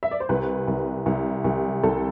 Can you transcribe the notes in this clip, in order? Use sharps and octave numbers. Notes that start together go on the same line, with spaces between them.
E5
D5
C5
C2 B4
C2
C2
C2
C2 A4